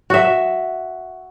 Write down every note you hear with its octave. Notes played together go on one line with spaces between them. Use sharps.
F#4 E5